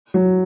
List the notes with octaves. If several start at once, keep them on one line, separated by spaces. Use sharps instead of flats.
F#3